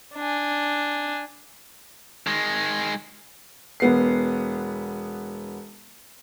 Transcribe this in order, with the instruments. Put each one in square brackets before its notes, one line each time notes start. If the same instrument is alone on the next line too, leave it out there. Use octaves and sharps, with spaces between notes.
[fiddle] D4 G#5
[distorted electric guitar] D#3 G#3
[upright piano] E1 B3 C7